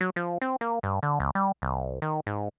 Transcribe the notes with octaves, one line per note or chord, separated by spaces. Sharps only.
F#3
F3
C4
A#3
G2
D3
C#2
G3
C2
D#3
G#2